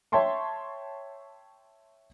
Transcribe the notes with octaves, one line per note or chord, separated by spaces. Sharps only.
C#5 E5 G5 A5 C6 C#6